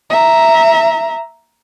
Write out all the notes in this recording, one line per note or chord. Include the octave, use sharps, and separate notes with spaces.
E5 A#5